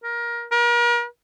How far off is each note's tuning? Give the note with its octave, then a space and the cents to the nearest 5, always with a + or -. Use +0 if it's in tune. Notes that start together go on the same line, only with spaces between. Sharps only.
A#4 +20
A#4 +40